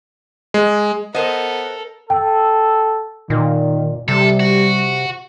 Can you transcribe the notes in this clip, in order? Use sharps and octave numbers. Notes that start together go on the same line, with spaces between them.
G#3
B3 A4 A#4 C5 D#5
A4 G5
A#2 D#3
C3 G3 A4
F#4